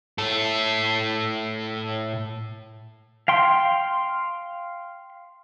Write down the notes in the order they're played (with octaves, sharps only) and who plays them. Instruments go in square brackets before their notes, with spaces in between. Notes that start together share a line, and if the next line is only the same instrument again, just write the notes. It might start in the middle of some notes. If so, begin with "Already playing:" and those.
[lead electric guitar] A2 A4
[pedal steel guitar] F5 G5 C6